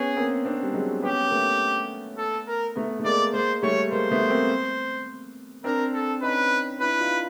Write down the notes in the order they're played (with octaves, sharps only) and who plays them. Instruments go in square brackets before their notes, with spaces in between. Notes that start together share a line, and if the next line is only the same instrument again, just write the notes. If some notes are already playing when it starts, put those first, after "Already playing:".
Already playing: [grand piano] B3 C#4 [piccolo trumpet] G#4
[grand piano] A#3 C4
C4 D4
G3
F#3 G#3
[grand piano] B3 C#4 [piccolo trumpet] G4
[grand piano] A#3
A3 B3
[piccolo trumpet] A4
A#4
[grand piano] A3 B3
A3
[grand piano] G#3 A#3 [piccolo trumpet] D5
[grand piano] G#3 A#3 [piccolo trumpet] C5
[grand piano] G3 A3 [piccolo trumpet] C#5
[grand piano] G#3 A#3 [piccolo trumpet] C5
[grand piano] A3 B3
A#3 C4
[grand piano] C4 D4 [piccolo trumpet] A#4
[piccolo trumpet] A4
[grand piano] C#4 D#4 [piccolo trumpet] B4
[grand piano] D4 E4 [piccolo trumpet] B4
[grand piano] D#4 F4